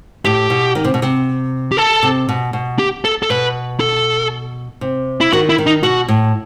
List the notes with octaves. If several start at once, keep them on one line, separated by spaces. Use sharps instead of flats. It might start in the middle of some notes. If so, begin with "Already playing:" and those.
A2 G4
B2
D#3
C3
B2
C3
G4
A4
C3
B2
B2
G4
A4
A4
B2 B4
A4
C3
E4
D#3 F#4
E4
D#3
D#4
B2 F#4
A2